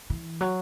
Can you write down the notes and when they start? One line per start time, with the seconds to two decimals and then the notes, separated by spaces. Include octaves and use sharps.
0.10 E3
0.41 F#3